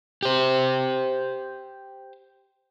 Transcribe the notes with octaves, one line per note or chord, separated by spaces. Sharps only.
G4 C5